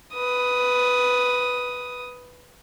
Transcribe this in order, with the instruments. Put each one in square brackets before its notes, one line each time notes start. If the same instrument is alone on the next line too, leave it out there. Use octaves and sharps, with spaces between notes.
[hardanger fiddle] B4 D#6